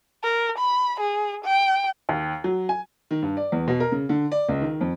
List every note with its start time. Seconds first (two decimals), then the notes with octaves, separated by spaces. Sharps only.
0.24 A#4
0.59 B5
1.00 G#4
1.45 G5
2.09 D#2
2.44 F#3
2.69 G#5
3.11 D#3
3.22 G2
3.37 D5
3.52 E2
3.68 B2
3.80 A#4
3.92 C#3
4.09 D3
4.32 D5
4.48 C#2
4.61 D#3
4.81 F2